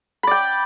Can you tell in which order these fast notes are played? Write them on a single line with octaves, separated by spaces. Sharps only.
B5 D5 G5